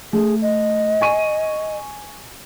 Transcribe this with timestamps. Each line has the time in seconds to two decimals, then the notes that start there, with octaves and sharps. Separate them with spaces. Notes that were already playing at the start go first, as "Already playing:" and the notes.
0.13 A3 G#4
0.42 D#5
1.01 G#5 C#6 D#7